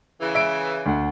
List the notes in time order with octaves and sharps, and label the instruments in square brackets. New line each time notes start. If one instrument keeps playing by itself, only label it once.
[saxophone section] C#3 E3
[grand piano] E5 D7
D2 F#5